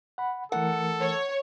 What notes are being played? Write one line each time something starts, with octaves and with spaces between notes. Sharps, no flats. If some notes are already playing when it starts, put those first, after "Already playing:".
F#5 B5
E3 A3 A4 A#4 F#5
C#5